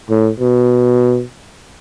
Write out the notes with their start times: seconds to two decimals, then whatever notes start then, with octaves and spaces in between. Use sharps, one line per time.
0.10 A2
0.40 B2